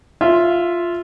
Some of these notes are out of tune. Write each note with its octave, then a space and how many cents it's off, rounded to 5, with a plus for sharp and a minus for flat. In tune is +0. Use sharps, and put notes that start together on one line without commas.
F4 +0 E5 +10